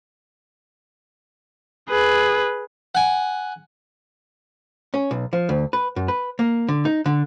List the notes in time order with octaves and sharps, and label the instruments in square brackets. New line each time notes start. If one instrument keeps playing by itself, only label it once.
[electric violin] G#4 B4
[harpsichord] F#5 G#5
[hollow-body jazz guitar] C#4
B1
F3
D2
B4
F#2
B4
A#3
D3
D#4
D3